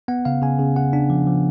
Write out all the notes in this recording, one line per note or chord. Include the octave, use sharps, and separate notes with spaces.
B3 F#5
C#3 F5
C#3 G#5
C#3
C#3 F#5
D4
F3
F3